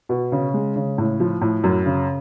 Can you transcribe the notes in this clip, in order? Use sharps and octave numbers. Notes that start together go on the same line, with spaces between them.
B2
C#3
G#3
C#3
A2
F3
A2
F#2
C#3